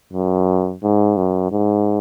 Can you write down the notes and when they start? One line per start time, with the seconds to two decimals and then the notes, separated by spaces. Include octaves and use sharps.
0.13 F#2
0.83 G#2
1.17 F#2
1.52 G#2